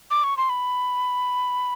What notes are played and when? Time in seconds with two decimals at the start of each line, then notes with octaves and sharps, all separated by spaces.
0.11 D6
0.24 C#6
0.37 C6
0.49 B5